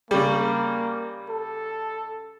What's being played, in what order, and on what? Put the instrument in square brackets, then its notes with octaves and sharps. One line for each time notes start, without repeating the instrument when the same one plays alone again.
[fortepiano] C#3 G3 [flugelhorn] A#3
[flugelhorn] A4